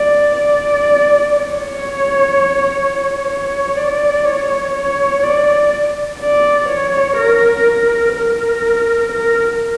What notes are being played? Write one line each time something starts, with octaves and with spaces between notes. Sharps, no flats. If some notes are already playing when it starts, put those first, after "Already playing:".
Already playing: D5
D5
C#5
C#5
D5
C#5
C#5
D5
D5
C#5
A#4
A#4
A#4